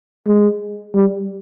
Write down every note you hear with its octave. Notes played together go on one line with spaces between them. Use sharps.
G#3
G3